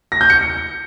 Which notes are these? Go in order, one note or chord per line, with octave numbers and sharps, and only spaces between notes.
A#6
G6
C#7